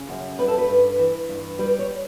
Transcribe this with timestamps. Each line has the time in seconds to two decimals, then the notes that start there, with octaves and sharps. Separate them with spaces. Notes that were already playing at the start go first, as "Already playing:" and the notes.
Already playing: C#3
0.09 F#2
0.38 G3 B4
0.48 A4
0.58 B4
0.69 G2
0.99 E3
1.29 G2
1.59 G3 B4
1.79 C#5